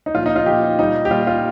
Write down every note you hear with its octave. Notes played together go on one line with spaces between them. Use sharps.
D#4
A#2 F3 F4
D#4
F4
A#2 F3 G4
A#2 G3 D#4
G4
A#2 G3 F4
F4